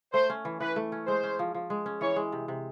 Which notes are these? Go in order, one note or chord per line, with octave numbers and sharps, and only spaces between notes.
A3 C5
C#4
E3
E3 B4
A3
C#4
G#3 C5
C#4
F3
F3
G#3
C#4
E3 C#5
G#3
C3
C3